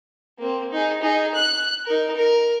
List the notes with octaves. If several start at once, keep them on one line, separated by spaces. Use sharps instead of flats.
A#3 C4
D#4 G#4
D#4 G#4
F#6
D#4 A#4
A#4